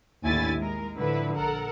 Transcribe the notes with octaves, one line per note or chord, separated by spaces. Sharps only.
A1 D#2 D3 E4 G#5 A6
G#3 A#4
A2 D3 F3 E4 B4
A#1 A4 A#4 F#5